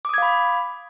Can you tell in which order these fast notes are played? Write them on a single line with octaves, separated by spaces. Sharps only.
D6 D#6 G#6 F5 B5